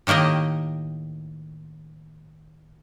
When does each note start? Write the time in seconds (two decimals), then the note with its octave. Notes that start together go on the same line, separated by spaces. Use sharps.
0.07 A2 D#3 A#3 G4 D#5